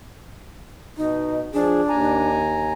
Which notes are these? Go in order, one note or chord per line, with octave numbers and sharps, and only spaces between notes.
B2 D#4
F3 D4 G#4
D#2 G#5 A#5